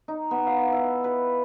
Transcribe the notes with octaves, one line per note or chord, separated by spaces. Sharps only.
D#4
B3
F5
E4
B4